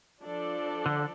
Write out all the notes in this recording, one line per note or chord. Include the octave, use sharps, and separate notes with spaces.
F3 D4 A4 D5
D3